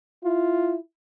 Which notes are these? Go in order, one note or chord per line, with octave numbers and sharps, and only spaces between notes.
E4 F4